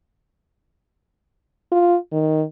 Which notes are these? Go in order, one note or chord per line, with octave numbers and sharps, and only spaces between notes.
F4
D#3